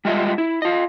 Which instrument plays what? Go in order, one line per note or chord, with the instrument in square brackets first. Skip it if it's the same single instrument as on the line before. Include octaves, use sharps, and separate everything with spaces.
[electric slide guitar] G3 G#3 F4 D#5 E5
E4
F4 D#5